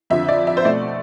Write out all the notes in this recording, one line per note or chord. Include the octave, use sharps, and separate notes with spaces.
F2 D3 F3 E5
D5
E5
C5
B2 A3 C4 D5